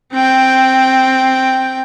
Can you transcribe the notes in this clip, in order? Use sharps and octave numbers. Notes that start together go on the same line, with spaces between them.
C4 G5